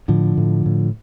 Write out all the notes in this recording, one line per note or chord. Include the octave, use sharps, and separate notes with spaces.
A2 D3 F3
A2
A2